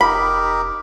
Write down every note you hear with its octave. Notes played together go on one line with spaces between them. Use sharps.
F1 D#4 G4 A#4 B5